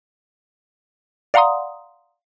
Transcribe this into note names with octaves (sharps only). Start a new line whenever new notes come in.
D5 F5 F#5 A#5 C6 D#6